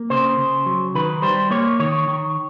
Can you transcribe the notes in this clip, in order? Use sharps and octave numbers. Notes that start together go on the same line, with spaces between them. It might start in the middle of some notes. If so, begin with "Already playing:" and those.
Already playing: A#3
C#3 C5
C#3
F#3
D#3 B4
G3 C5
A#3 C#5
D#3 C#5
D#3